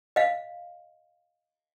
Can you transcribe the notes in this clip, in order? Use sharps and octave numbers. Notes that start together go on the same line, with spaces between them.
D#5 F5